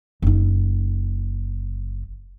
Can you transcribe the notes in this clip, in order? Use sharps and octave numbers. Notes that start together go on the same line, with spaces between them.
F#1 D#4